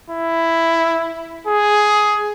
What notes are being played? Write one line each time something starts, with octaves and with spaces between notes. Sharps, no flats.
E4
G#4